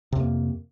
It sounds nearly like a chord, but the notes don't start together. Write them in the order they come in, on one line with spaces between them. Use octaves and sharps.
C3 F2 A#3